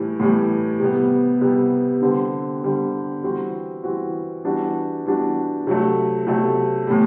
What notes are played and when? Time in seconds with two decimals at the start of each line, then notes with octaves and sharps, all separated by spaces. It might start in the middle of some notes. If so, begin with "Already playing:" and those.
Already playing: A2 E3 G3
0.20 A2 E3 G3
0.80 C3 G3 B3
1.41 C3 G3 B3
2.02 D3 G3 C4
2.62 D3 G3 C4
3.23 E3 G3 C4 F#4
3.83 E3 G3 C4 F#4
4.45 E3 G3 D4 F#4
5.06 E3 G3 D4 F#4
5.67 C3 F#3 A3
6.27 C3 F#3 A3
6.87 A2 E3 G3